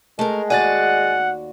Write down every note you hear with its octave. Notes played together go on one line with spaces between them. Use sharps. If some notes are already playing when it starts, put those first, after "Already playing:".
G#3 A3 A#4
D#2 F#4 D5 F#5 G#5 F#6 A6